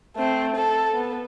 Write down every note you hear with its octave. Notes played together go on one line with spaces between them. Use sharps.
A3 C4
A4
B3